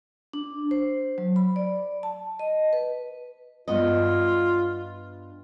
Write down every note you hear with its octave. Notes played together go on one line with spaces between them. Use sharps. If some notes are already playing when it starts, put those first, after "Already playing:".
D4
C5
F#3
B5
D5
A5
D#5
B4
G2 B3 F4 D#5